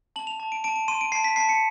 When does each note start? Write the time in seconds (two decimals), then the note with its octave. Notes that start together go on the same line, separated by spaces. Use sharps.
0.16 A5 F#7
0.27 F7
0.40 A5
0.52 D7
0.64 A5 D7
0.76 D7
0.88 C6 D#7
1.01 D7
1.12 A5 C7
1.24 B6
1.36 A5 C7
1.49 C#7